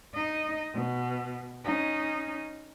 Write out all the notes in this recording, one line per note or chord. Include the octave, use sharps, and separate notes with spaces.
D#4 D#5
B2
C#4 D#4